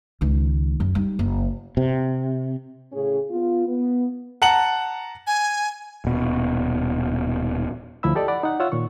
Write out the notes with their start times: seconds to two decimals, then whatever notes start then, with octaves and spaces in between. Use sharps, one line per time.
0.21 C#2 D#3
0.80 F#2
0.95 G3 D#4
1.19 F#1
1.77 C3
2.92 A2 C#3 C#4 G#4
3.31 B3 F4
3.67 B3
4.42 F#5 A5 A#5 C#7 F#7
5.27 G#5
6.05 D#1 B2
8.03 D2 F3 E4 E5 B5 E6
8.15 G4 A4 D5 D#5
8.28 D5 F#5 B5
8.43 D#4 F#5
8.60 F4 C#5 E5 F#5 E6
8.72 A#2 D#3 C#6